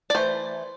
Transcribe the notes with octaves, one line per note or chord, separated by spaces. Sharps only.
D5
E3 A3 C5